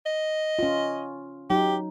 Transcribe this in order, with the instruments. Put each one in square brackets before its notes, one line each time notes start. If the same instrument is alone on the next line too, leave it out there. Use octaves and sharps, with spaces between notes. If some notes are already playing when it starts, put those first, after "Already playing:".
[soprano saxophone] D#5
[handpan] C#4 F4
[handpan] F#3 D#4 [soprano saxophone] G4